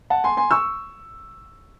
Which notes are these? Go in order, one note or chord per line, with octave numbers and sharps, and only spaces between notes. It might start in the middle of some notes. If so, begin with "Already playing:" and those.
F#5 A5
G#5 C6
G#5 C6
C#6 E6